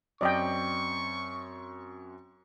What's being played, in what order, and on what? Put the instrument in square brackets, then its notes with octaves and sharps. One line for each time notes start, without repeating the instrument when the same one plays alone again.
[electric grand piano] F#2 C4 [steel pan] D5 D#5 G5 [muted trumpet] C#6